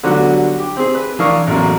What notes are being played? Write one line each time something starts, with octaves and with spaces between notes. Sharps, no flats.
D3 F#3 G3 B3 F#4
G4
C4 G#4
B4
E3 D4 A#4 F5 C#6 D#6
A1 E2 F#3 A#3